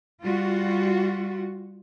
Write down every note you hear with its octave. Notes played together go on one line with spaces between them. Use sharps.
G3 F4 F#4